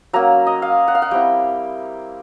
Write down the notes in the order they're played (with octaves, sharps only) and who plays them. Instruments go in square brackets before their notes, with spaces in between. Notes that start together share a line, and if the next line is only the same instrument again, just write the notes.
[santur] F#3 A#3 C#4 A#5
D#5
F5
F#5
F5
F#5
G3 C4 E4 G5